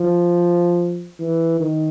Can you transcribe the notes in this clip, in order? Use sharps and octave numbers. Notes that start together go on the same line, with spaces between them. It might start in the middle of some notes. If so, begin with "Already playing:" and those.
Already playing: F3
E3
D#3